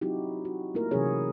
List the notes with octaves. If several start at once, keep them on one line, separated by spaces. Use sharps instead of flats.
F#3 C4 D#4 E4 F#4 G4
F#4
A3 A#3 E4 F4 A#4
C3 E3 F#3 C#4 G#4 C#5